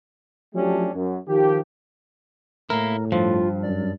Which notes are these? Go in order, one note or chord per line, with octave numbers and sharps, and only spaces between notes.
F3 F#3 A3 C#4 D4 G4
F#2
D#3 F3 G4
A2 A#3 E4 A#4
G2 F3 F4
F#2 D5